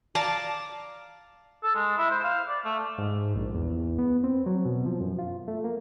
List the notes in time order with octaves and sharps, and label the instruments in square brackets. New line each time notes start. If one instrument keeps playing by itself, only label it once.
[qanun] D5 F5 A5 A#5
[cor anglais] A4
G#3
E4
C5
F5
D5
A3
[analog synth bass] G#2
A#1
E2
B3
C4
F#3
B2
F3
F#2
F4
A3
A#3